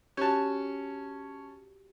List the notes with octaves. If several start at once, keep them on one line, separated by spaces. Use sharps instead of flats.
C#4 F#4 G4 A5